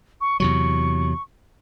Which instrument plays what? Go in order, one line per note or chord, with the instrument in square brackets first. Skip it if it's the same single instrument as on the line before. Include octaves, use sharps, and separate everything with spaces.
[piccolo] C#6
[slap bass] E2 C3 F#3 [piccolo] C#6